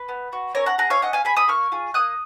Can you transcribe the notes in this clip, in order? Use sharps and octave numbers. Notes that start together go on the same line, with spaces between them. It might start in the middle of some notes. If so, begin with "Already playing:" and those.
Already playing: B4
B3
F#4
C#4 A#4 C#5
F#5 A#5
G#4 F#5 A#5
C#5 F5
C#4 D#5 F#5
F5 G#5
G#4 G#5 B5
B5 D#6
A#3 C#6 F6
F4 G#4
A#3 D#6 F#6